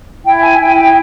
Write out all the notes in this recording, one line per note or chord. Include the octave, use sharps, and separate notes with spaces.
E4 G5
G#5
E4 G5
G5